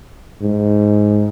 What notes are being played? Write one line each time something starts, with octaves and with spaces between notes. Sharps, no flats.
G#2